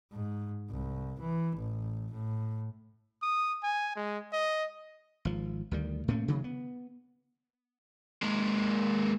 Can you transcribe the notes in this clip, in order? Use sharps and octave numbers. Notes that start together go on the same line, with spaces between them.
G#2
C2
E3
A1
A2
D#6
G#5
G#3
D#5
G#1 F3
D2 D#3 G3
A2 A3 A#3 C#4
C3 D#3 F#3
B3
G#3 A#3